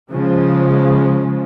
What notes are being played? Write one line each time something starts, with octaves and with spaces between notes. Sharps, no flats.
C#3 F3 G#3